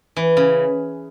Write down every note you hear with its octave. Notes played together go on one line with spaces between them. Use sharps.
E3
C#3